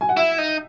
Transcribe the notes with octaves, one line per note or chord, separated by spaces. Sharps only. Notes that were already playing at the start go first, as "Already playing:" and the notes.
G#5
F#5
E4 E5
D#4